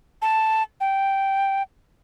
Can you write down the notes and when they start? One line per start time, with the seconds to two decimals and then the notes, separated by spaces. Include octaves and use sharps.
0.22 A5
0.81 G5